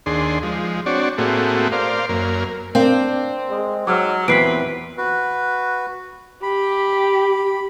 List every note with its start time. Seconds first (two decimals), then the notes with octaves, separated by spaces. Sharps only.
0.06 D#2 D4 G#4 C6
0.43 F3 G#3
0.86 C4 D4 F#4 C#5 D5
1.18 A2 A3 A#3 C4 F#4 G#4
1.72 A#4 C5 D5 F5
2.09 F#2 A#3 A#4
2.75 C4 D4 A#4 F5
3.49 G#3
3.87 G#2 F#3 D6 E6 F6
4.28 E2 A#2 C4 G4 B4 B6 C7 D7
4.98 F#4 B4
6.43 G4 B5